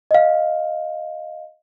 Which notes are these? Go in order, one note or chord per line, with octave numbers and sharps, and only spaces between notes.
D#5 F5